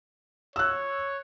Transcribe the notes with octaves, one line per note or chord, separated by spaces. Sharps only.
C#5 E6 F#6